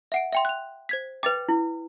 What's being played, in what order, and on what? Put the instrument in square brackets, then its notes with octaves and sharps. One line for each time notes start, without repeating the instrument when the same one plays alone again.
[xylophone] E5 F#5 D7
E5 G5 C6
F#6 F7
C5 G#6 B6
[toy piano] B4 G5 [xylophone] D6 A6 F7
[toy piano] E4